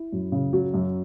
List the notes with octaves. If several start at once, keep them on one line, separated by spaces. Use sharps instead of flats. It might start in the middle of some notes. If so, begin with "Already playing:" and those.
Already playing: E4
F#2
C#3
F#3
F#2